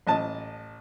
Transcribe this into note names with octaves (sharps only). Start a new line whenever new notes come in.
A1 D#5 A5